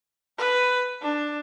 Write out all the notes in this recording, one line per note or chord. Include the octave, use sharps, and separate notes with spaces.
B4
D4